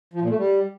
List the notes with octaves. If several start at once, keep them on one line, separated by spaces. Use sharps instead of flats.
F3
A#2
A3
G3